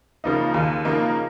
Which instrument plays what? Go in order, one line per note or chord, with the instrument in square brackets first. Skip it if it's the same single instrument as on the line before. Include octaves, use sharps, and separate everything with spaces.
[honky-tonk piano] C#3 F3 A#3 D#4
D#2
C#3 F3 A#3 D#4